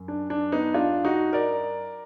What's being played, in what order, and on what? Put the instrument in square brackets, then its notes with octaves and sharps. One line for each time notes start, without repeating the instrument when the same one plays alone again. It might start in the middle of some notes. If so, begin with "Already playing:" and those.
Already playing: [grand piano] F#2
D4
D4
B3 D#4
D4 F4
D#4 F#4
A#4 D5